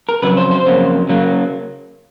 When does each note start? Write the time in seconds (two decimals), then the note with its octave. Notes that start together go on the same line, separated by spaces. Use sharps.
0.09 A#4
0.22 F2 C#3 F#3 B4
0.37 C5
0.51 C5
0.66 F2 C#3 F#3 A#3
1.09 C#3 F#3 A#3